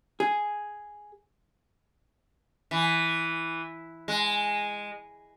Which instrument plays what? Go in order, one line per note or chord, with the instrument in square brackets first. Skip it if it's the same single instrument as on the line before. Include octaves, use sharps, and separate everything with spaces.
[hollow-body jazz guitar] G#4
[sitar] E3
G#3